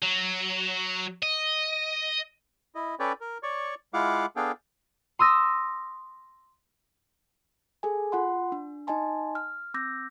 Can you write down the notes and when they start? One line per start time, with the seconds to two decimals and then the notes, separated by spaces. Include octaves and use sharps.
0.02 F#3
1.23 D#5
2.75 E4 D#5
3.00 C#4 A4 B4 C#5 D5 G5
3.21 A#4
3.43 C#5 D5 C#6
3.94 G#3 E4 F4 F5 F#5 D6
4.36 B3 D4 G#4 A4 F5 G5
5.19 C6 D#6 E6 A#6
7.83 G#4 A4 G#5
8.12 F4 F#5 C6
8.52 D4
8.87 D#4 D#5 G#5 A5 C6
9.35 F6
9.74 C4 D6 E6 G6 A#6